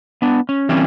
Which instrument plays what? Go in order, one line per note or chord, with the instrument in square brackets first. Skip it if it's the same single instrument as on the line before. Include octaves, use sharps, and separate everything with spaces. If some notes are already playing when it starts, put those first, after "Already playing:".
[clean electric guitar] B3 D4
C#4
E3 G3 A#3 C4 C#4